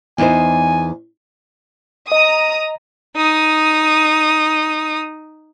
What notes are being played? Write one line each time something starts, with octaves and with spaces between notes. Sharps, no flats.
E2 D#4 C5 G#5
D#5 A#5 D#6
D#4 D#6